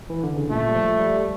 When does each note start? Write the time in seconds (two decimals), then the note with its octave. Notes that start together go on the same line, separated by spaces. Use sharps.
0.10 E3
0.23 D3
0.37 C#3
0.50 A#2 A3
0.68 G3
0.75 F3
0.99 G3